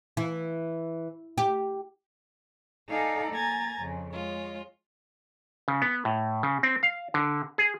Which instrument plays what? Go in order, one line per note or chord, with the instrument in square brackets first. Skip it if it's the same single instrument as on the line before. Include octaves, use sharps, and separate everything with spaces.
[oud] E3
G4
[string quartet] D#4 A4 D5 F5 G#5 A#5
A#3 G#5 A#5 G#6 A6
F2 C#3
G#3 F4 C#5
[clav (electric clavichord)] C#3
B3
A2
C#3
C4
F5
D3
G#4